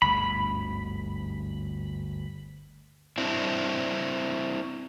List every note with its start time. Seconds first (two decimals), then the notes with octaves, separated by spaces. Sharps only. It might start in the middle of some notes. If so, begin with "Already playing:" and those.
0.02 G1 D2 G#2 B5
3.18 C4 D4 E4